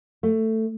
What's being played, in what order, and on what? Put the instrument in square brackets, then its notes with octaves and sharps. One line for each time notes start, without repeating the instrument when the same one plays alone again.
[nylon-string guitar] A3